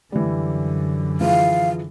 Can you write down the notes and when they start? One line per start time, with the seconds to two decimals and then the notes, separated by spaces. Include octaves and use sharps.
0.12 F#2 D3 E3 G3
1.21 E3 F3 G#4 F5